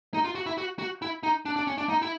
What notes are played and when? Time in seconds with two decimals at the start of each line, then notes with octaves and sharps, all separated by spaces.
0.14 D#4
0.25 F4
0.35 F#4
0.46 E4
0.58 F#4
0.79 F#4
1.02 E4
1.23 D#4
1.46 D4
1.56 D4
1.67 C#4
1.78 D4
1.89 D#4
2.02 E4